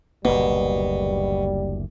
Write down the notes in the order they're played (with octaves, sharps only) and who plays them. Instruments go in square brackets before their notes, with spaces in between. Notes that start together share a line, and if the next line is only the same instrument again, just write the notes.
[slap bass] F#1 D2 A#3 [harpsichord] B2 [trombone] G3